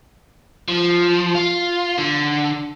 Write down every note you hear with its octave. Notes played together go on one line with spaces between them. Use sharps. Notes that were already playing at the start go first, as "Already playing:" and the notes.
F3
F4
D3